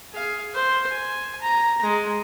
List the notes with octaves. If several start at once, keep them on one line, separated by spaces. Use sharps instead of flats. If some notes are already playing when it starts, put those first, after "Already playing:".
G#4 F5
C5
G#5
A#5
G#3